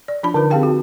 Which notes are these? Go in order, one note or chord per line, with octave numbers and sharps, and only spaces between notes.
D5
F3 D4 F4 A5 B5
D3 D#4 F4 B4
C4 G4 G#4 F5 G5 A5
F#4